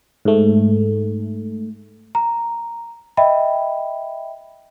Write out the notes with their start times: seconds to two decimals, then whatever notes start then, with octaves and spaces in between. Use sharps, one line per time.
0.25 G#2 A3
2.15 A#5
3.17 D#5 E5 G5 B5